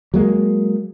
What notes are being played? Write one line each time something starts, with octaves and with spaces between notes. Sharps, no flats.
F#3 G#3 A#3